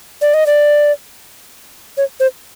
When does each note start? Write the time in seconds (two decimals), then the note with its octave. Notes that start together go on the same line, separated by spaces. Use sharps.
0.21 D5
0.34 D#5
0.46 D5
1.97 C#5
2.20 C5